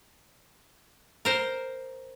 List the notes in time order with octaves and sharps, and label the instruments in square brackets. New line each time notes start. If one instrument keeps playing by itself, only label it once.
[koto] A#4 C5